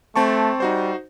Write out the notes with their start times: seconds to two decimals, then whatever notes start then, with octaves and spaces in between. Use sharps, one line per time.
0.16 A3 C4 A5 C#6
0.60 G3 D#4 F#4 C5